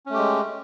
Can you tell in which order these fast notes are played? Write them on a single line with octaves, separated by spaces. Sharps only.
C#4 A3 G4 G#3